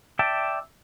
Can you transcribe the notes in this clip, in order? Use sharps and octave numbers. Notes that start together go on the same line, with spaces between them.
D5 E5 G5 A5